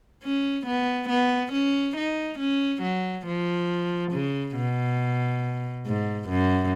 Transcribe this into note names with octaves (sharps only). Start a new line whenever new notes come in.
C#4
B3
B3
C#4
D#4
C#4
F#3
F3
C#3
B2
G#2
F#2